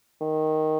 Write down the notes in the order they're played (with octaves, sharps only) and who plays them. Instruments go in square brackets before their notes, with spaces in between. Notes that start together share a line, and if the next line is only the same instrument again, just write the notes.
[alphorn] D#3